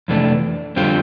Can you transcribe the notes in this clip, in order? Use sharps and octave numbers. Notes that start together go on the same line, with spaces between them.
F2 C3 E3 A3 D4
F2 D3 G3 C4 F4